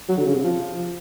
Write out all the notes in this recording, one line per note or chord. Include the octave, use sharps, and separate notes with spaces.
F#3
D3
C#3
C3
F3